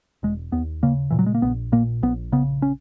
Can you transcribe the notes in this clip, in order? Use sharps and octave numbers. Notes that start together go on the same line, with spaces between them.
E1 G#3
D#2 B3
C#3 A#3
A#2 E3
F#3
G#3
A#3
A#1 B3
A#2 A#3
A#1 B3
C#3 B3
C#4